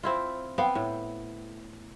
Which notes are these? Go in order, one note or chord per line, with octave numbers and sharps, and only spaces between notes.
C4 E4 F4
B3 C4 F5 G5
A2